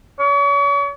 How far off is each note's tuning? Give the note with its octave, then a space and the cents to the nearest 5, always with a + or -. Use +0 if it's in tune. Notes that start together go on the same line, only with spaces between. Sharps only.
C#5 +40